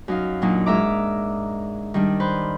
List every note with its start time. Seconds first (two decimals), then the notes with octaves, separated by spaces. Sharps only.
0.08 F#2 D#4 F5
0.42 A#2 F#3 D4 D#4
0.66 G#2 A#4 E5 A#5 D6
1.94 D#3 G3 D4
2.20 B4 C5 C6